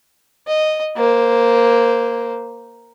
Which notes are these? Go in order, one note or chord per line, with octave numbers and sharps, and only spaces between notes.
D#5
A#3 C5